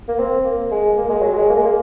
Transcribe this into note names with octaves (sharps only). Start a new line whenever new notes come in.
A#3
C4
A#3
G#3
A#3
G#3
F#3
G#3
A#3
G#3
A#3